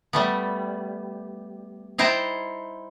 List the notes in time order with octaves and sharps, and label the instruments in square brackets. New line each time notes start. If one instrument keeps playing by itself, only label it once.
[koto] G3 A3 B3
D#4 E4 C5 G5 A5 A#5